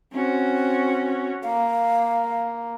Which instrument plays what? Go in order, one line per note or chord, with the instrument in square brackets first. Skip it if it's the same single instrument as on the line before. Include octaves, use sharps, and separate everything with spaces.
[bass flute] C4 [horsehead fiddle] C#4 F#4
[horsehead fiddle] A#3 [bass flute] F5